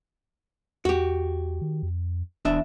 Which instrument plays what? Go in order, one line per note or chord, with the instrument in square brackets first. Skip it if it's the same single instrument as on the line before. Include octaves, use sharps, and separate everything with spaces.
[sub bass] E2 [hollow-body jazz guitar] F#4 G4
[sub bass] D#3
F2
[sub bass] D#1 [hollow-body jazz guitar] E2 D4 E5